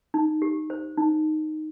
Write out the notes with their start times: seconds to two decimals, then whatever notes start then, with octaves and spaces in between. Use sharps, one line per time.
0.14 D#4
0.42 G4
0.70 C5
0.98 D#4